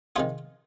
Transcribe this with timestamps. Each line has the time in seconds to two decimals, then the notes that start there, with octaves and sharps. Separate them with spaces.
0.16 C3 D#3 F4 G#4